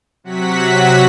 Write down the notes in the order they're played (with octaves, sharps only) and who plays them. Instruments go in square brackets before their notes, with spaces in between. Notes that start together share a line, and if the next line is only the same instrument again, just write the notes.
[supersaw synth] C3 F#3 F#4 F#5 B6